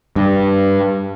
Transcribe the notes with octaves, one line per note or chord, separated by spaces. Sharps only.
G2